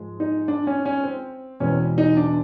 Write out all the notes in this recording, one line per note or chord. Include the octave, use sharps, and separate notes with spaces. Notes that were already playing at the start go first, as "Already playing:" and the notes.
Already playing: G#2 F3 G#3
D#4
D4
C#4
C#4
C4
E2 B2 G#3 C4 C#4
D#4
D4